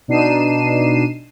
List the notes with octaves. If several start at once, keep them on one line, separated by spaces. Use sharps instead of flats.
B2 D4 D#4 C7 D#7 E7